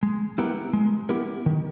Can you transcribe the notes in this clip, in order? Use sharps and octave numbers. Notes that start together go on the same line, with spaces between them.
G#3
B3 E4 G4 A#4
G#3
B3 E4 G4 A#4
D#3